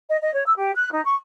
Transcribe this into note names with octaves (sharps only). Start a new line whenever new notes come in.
D#5
D#5
C#5
E6
G4
F#6
D#4
C#6